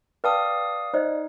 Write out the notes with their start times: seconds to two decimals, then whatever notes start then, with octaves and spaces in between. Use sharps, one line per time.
0.24 B4 D5 F5 G5 A5 D#6
0.94 D#4 C5 D5 D#5